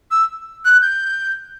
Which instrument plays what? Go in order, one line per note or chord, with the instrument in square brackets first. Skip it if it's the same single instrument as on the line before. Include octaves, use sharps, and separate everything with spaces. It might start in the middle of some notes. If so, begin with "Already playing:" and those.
[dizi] E6
F#6
G6